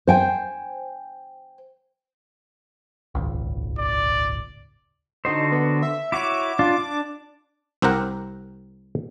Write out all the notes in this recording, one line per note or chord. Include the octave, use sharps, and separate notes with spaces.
C5 G5 G#5
D#1 G#1 C#2
D5
D3 D#4 F#4 C5
B3
E5
E4 F#4 C#5 D6
D4 F4
D4
C2 C4 G4 A#4 F#5